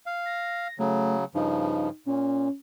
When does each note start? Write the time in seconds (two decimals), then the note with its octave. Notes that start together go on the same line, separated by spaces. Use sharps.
0.06 F5
0.26 A#6
0.79 C#3 F#3 A3
1.35 G2 C#3 F3 D#4
2.06 A#2 C#4